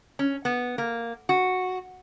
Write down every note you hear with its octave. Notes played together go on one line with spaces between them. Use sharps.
C#4
B3
A#3
F#4